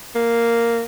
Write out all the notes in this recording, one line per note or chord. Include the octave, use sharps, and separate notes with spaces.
A#3